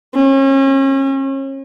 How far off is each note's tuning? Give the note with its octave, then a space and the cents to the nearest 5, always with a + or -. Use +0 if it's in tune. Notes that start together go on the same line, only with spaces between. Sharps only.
C#4 -35